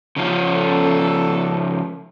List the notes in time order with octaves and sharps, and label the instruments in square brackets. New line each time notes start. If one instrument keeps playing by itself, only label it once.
[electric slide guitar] C#3 F3 C#4
[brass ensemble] A4